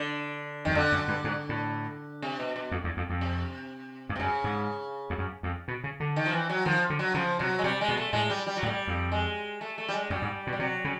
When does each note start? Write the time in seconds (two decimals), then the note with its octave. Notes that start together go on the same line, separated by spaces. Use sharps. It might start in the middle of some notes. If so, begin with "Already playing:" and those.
Already playing: D3
0.65 F#2 D#3
0.75 F2 D3
0.92 F#2
1.08 G2
1.24 G#2
1.49 A2
2.22 C3
2.40 B2
2.56 B2
2.71 F2
2.84 E2
2.97 F2
3.10 F2
3.21 C3
4.09 G2
4.16 C3
4.19 F#2 C#3
4.44 G#2
5.10 F2
5.18 F#2
5.43 F2
5.68 B2
5.84 C#3
6.00 D3
6.16 D#3
6.26 F3
6.32 E3
6.49 F#3
6.65 D#3 F3
6.90 D3
6.99 F#3
7.14 C#3 F3
7.39 C3 F#3
7.59 G#3
7.64 C3 G3
7.81 G#3
7.88 B2
7.97 A3
8.13 A2 G#3
8.30 G3
8.47 G3
8.57 F#3
8.63 A2
8.66 G3
8.87 F2
9.12 G#3
9.61 A3
9.78 A3
9.88 G3
9.93 G#3
10.10 F#2 G3
10.22 G#2
10.47 B2
10.53 G3
10.59 C3 F#3
10.84 C#3